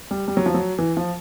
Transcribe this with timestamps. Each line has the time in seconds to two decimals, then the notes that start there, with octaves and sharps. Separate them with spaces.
0.11 G3
0.28 G3
0.37 F#3
0.46 F3
0.54 F#3
0.79 E3
0.97 F3